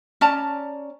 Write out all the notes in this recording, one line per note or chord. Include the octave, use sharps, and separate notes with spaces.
C#4 D5 A5 A#5